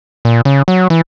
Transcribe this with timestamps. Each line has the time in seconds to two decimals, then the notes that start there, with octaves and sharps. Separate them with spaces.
0.25 A#2
0.45 C#3
0.68 F#3
0.90 E3